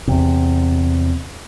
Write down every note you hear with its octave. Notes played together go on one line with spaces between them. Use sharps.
E2 C3